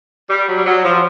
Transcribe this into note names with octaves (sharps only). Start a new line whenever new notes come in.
G3
F#3
G3
F#3
F3